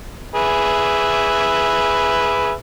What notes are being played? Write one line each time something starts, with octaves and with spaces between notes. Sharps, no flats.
G#4 B4 E5